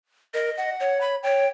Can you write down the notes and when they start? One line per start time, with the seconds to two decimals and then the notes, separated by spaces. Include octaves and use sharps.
0.34 A#4 D#5
0.58 F#5
0.80 C#5
1.01 B5
1.23 C#5 G5